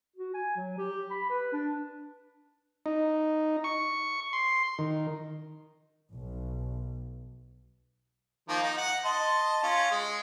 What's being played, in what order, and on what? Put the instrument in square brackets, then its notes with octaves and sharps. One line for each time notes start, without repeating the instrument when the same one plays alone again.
[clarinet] F#4
G#5
F#3
G4
B5
B4
D4
[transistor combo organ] D#4
C#6
C6
D#3
[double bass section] B1
[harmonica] D#3 F3 A#3
D#4
F#5
D#5 A5 C6
C#4 F4
G#3